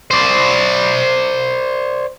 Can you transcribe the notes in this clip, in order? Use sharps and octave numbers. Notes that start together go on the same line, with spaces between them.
C5 D5